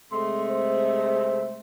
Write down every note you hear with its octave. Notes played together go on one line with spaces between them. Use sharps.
C3 G#3 A3 C6
C5